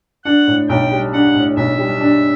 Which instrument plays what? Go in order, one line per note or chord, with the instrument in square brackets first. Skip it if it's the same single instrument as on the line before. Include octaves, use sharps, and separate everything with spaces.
[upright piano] D4 [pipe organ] F#5
[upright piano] A2
[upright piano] B1 [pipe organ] G5
[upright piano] G3
[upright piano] D4 [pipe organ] F#5
[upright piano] A2
[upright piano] B1 [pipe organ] E5
[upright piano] G3
D4